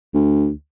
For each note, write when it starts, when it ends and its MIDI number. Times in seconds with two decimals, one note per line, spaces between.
0.14 0.50 38